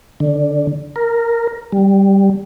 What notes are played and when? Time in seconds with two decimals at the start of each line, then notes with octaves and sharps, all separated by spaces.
0.20 D3
0.96 A#4
1.72 G3